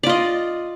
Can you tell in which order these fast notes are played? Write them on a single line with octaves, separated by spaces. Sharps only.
D5 F4 D#5